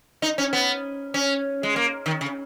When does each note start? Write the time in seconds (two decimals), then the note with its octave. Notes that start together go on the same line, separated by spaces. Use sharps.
0.22 D#4
0.38 C#4
0.53 B3
1.14 C#4
1.63 G#3
1.76 A#3
2.06 D#3
2.21 C#3